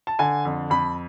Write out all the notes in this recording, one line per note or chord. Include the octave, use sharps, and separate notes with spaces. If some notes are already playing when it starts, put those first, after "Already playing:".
A5
D3 G#5
F2
F2 B5